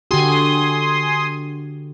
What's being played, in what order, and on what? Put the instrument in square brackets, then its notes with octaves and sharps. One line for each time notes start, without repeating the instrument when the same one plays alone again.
[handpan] D3 F#4 G4 [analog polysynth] G#5 C6 D#6